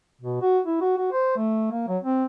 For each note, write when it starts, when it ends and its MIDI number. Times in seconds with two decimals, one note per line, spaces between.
0.21 0.41 47
0.42 0.59 66
0.66 0.79 64
0.81 0.96 66
0.97 1.12 66
1.12 1.36 72
1.37 1.71 57
1.71 1.85 58
1.88 1.98 54
2.03 2.24 60